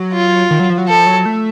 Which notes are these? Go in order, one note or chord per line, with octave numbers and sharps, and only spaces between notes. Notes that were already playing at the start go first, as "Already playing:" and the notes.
Already playing: F#3
F4
D#3
F#3
F3
F#3
F3 A4
F#3
A3